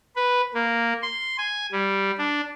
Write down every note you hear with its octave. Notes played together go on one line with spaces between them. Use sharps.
B4
A#3
C6
G#5
G3
D4